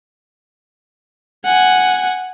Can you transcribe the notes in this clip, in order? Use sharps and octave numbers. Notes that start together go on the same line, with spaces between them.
F#5 G#5